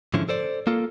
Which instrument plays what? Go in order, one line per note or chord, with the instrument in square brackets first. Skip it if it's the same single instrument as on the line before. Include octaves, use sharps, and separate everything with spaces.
[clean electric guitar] G#2 D3 F3 C#4 E4
A4 C5 D5
A#3 F4 A4